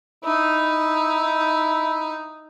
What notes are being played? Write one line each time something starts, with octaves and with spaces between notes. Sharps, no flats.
D#4 E4